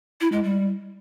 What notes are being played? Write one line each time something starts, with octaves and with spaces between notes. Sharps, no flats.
E4
G#3
G3